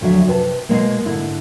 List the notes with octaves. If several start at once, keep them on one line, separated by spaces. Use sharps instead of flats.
D2 F3 F#3 D4 E5
C3 B4 A5
B2 G#3 A#3
G#2 D3 E4